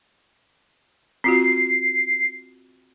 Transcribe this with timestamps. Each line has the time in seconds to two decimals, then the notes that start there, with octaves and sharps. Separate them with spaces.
1.24 C4 F4 F#4 C7